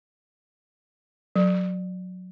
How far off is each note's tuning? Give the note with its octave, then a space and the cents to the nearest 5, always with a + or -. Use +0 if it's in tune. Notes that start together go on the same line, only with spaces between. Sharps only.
F#3 -15